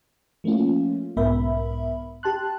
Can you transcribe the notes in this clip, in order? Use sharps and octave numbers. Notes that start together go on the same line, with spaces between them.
F3 A3 A#3 C#4 F4
B1 G#2 B3 A#4 E5 B5
G4 A5 C6 F#6